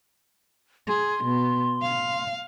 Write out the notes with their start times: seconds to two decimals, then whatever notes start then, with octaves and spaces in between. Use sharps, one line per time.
0.88 G#4 C6
1.24 B2 B3
1.82 F5